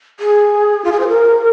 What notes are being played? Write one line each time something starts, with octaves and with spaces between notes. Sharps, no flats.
G#4
F4
G#4
C5
A#4